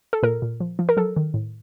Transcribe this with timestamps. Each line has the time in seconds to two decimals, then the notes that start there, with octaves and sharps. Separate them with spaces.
0.13 A4
0.23 A#2 A#4
0.42 A#2
0.60 F3
0.79 F3
0.89 A#4
0.97 F#3 A4
1.16 D#3
1.34 A2